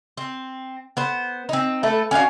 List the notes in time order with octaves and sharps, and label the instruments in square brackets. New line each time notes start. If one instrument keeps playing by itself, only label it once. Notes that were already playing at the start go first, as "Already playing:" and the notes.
[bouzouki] C4
B3 C5
C4 D#4
A3 A4 B4
C#4 F#4 D5 F5